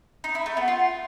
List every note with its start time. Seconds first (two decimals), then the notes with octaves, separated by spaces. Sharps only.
0.24 D#4
0.35 E4
0.46 A3
0.57 B3
0.68 F4